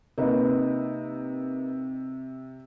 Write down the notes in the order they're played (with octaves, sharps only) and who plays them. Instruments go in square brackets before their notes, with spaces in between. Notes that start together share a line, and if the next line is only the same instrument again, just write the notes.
[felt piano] C3 [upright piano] A#3 D#4 B4